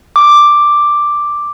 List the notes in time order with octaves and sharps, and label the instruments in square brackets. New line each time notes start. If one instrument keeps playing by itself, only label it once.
[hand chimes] D6